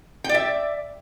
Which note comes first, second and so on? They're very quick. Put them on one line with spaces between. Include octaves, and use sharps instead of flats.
G5 D5 E5